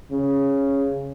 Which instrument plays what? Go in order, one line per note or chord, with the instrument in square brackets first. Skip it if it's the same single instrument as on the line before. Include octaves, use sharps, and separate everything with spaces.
[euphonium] C#3